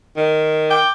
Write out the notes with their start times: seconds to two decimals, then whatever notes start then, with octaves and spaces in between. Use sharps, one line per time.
0.17 D#3
0.71 G5 D6